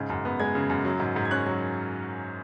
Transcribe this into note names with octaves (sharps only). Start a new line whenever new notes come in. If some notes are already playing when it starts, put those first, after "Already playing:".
Already playing: G#2 C#3
F#2
B3
G#3 G#6
C#3
F#2
F#3
G#2
G#2
G#6
C#4 F#6
F#3